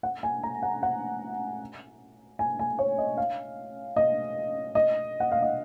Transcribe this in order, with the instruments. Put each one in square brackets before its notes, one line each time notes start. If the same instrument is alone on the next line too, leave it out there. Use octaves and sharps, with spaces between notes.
[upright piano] F#5
G#5
A#5
F#5
F#5
G#5
G#5
C#5
D#5
F5
D#5
D#5
F#5
F5
D#5